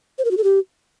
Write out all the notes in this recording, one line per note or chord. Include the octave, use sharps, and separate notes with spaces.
C5
A#4
F#4
A4
G4